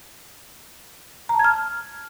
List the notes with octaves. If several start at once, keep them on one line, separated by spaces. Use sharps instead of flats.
A#5
A5
G#6
F6